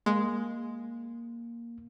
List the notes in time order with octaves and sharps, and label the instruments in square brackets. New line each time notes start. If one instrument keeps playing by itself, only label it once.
[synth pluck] G#3 [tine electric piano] A#3